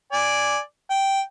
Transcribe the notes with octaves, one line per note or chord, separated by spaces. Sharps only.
D5 G#5
G5